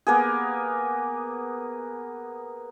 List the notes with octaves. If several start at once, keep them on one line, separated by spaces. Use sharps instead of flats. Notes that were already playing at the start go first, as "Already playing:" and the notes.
A#3 B3 G#4